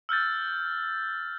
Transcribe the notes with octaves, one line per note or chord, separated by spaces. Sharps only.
E6 F6 G6 A6